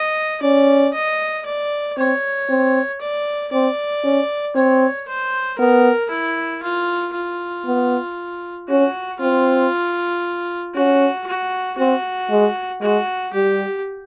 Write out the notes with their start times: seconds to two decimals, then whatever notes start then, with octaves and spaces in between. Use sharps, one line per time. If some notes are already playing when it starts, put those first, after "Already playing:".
Already playing: D#5
0.42 C#4 D5
0.94 D#5
1.46 D5
1.97 C4 C#5
2.49 C4
3.01 D5
3.52 C4 D5
4.04 C#4
4.55 C4 C#5
5.08 C5
5.59 B3 A#4
6.10 E4
6.63 F4
7.15 F4
7.66 B3
8.69 C#4 F#4
9.20 C4 F4
10.75 C#4 F#4
11.26 F#4
11.78 C4 F#4
12.30 G#3
12.82 G#3 F#4
13.33 G3 G4